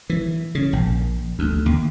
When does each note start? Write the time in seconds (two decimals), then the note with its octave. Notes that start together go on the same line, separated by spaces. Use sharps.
0.10 E3
0.55 C#3
0.73 A#1
1.39 D2
1.66 D#2